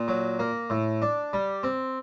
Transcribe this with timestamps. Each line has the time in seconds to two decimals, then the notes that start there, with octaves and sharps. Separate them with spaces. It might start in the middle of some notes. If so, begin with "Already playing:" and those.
Already playing: A#2
0.08 F#3
0.39 A#3
0.70 A2
1.02 D4
1.33 G3
1.63 C4